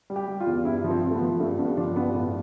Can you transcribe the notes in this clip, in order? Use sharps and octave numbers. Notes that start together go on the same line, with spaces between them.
G3
G4
G3
F4
E2
G2 E4
F3
C4
F3
A3
B3
F3
G2 A3
G2 B3
F3 D4
G2 B3
A2 B3